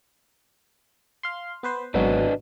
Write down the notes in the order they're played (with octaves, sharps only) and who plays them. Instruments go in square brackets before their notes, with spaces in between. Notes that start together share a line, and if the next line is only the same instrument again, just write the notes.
[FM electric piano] F5 C6
B3 B4 C5
[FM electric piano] G#1 B2 F#3 [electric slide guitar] D4 B4 D#5